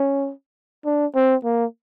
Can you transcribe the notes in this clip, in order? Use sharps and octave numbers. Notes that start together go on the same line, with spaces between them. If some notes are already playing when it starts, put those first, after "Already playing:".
Already playing: C#4
D4
C4
A#3